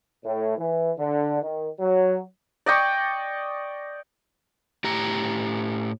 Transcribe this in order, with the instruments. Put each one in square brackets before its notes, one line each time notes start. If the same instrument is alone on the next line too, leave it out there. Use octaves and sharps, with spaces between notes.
[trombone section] A2
E3
D3
D#3
F#3
[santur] D5 D#5 G5 C#6
[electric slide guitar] A2 G4 A#5